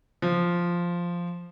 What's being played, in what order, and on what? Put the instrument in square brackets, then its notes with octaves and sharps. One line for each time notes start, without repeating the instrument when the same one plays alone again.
[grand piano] F3